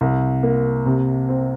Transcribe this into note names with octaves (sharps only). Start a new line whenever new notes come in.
C2
A#3
C3
C4